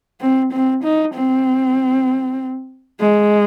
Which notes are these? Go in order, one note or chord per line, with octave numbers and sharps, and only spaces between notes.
C4
C4
D#4
C4
G#3